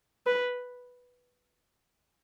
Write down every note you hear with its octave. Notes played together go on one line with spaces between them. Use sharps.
B4